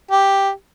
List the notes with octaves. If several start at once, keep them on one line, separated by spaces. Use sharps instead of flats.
G4